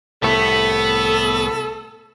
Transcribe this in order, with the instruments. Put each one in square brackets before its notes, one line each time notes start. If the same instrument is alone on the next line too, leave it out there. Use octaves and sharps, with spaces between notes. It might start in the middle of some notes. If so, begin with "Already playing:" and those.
[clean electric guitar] C2 A2 A3 [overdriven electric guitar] B3 [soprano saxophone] A4